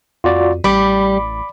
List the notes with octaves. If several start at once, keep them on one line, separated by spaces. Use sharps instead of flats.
F2 F4 F#4 D5
A1 G3 B5 D6